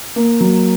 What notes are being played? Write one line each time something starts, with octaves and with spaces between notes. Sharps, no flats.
A#3
F#3